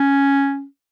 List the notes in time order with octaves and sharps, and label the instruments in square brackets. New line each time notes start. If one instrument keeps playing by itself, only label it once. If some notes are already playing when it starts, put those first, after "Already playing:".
Already playing: [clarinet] C#4